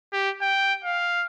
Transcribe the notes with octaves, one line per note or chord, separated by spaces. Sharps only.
G4
G5
F5